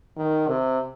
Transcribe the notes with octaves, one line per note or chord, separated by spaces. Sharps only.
D#3
C3